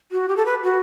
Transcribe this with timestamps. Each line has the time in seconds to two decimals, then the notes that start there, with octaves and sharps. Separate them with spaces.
0.12 F#4
0.28 G4
0.36 A4
0.46 B4
0.64 F#4